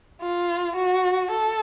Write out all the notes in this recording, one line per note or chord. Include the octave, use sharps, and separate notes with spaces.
F4
F#4
A4